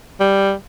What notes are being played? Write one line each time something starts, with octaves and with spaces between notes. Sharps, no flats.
G3